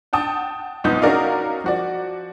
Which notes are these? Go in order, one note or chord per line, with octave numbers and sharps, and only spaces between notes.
F#5 G5 A5 D#6
B1 F2 B3 D#4 G6
C#4 D#4 F#4 A#4 D5 F5
F3 F#4 D5